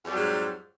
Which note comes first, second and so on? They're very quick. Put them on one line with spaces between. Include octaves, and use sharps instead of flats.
F2 G3 F#3 G#2